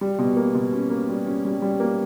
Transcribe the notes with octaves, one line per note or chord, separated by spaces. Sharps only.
G3
B2
A#3
B2
C#4
A#3
G3
C#4
G3
G3
A#3